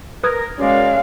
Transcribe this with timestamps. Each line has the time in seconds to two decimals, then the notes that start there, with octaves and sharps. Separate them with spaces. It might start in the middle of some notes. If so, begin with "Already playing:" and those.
0.24 A#4 B4 D#6 G#6
0.59 G#3 C#4 F#4 A#4 D5 F5